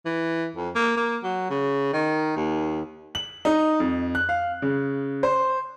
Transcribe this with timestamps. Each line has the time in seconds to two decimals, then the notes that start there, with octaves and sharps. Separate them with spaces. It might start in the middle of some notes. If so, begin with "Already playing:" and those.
0.06 E3
0.56 F2
0.75 A#3
0.97 A#3
1.24 F#3
1.50 C#3
1.93 D#3
2.37 D#2
3.15 F#7
3.45 D#4
3.80 F2
4.15 F#6
4.29 F5
4.62 C#3
5.23 C5